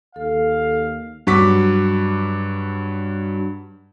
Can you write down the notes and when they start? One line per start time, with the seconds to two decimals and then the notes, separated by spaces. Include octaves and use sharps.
0.16 D#2 A4 F5
1.27 G2 F#3 C#6 D6 B6